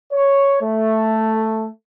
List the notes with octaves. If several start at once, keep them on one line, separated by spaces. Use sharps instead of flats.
C#5
A3